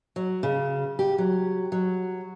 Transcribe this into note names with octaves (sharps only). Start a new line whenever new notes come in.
F#3
C#3
G4
F#3
F#3